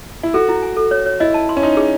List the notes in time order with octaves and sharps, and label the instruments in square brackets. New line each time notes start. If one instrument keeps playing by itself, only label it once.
[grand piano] E4
[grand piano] F#4 [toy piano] A4
[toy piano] E4
G#5
A4
C#5
C#5
[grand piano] E4 [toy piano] D#5
[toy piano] A5
C6
[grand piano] C#4
[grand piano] D#4 [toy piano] C6
[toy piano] G#4